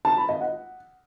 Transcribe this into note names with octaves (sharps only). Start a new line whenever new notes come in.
A5
B5
D#5
F#5